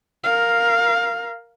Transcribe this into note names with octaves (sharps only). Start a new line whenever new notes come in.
A#4 F5